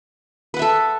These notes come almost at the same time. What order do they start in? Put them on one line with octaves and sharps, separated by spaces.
B4 F#5 E5 A4